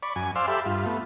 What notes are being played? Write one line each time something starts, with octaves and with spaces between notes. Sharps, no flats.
D5 B5 C#6
F#2 G#5
C5 D5 F5 C6 E6
G4 A4 E5 B5
G2 F4
A3 B3